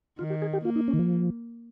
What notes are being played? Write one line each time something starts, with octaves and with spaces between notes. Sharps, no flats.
D#3 F4
G4
G#4
G4
A#3 F4
D#4
C#4
D#3
F3